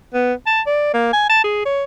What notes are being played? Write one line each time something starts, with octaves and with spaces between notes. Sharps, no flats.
B3
A5
D5
A#3
G#5
A5
G#4
C#5